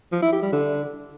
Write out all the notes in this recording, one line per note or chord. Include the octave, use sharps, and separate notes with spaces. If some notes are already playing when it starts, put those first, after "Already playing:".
F3
E4
G4
G3
D3